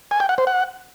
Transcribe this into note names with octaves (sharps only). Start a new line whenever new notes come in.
G#5
G5
F#5
C5
F#5